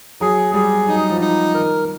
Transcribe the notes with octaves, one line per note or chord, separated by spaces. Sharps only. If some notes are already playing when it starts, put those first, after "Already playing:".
F#3 G#4
G3 G#4
F#3 D#4
F3
D#4
D#3 A#4